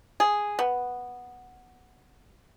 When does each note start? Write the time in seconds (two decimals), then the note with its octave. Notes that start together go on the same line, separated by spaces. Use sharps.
0.20 G#4
0.59 B3